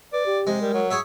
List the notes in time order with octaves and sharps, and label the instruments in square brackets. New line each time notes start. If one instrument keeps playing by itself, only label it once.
[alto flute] B4 [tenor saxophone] D5
[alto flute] G4
[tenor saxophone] C3 [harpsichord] G#3
[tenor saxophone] G3 [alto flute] A#4
[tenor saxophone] F#3
[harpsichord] G#4 C#5 E5